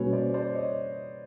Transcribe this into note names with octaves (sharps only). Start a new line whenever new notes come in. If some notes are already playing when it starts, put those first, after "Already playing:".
Already playing: B2 G3 A#3 C#4 F#4 B4 C#5
C5 D5
C5 D5
C#5 D#5